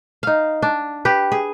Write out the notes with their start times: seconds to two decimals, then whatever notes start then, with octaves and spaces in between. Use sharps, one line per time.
0.23 D#4 F5
0.62 D4
1.05 G4 B4
1.32 G#4